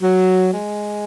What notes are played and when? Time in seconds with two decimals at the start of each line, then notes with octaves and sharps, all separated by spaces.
0.02 F#3
0.53 G#3